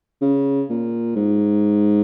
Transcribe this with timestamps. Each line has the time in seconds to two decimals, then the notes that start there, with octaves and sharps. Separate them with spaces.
0.21 C#3
0.70 A#2
1.16 G#2